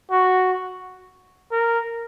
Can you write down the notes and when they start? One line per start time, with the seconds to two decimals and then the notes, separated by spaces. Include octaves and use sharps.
0.11 F#4
1.52 A#4